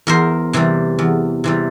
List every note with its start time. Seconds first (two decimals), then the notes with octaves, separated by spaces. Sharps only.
0.07 E2 A#4 C5
0.53 C3 E3 G3
0.99 E2
1.44 C3 E3 G3